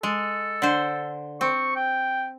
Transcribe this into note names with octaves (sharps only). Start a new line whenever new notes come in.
G#3 A4
D3 C5
C4 C#6
G5